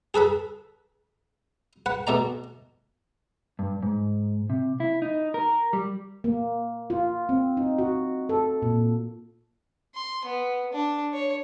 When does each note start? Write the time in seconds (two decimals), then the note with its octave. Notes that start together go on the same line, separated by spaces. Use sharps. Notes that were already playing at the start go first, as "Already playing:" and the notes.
0.14 G#4 A4 B4 B5
1.86 B4 F#5
2.07 B2 A3 D5 A#5
3.59 G2
3.83 G#2
4.50 C3
4.80 E4
5.02 D#4
5.34 A#4
5.73 G3
6.24 A#3
6.90 F4
7.29 C4
7.57 D#4
7.78 F#4
8.29 A4
8.62 A#2
9.95 C6
10.25 B3
10.73 D4
11.13 C#5